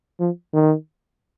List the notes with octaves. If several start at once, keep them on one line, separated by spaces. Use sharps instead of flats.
F3
D#3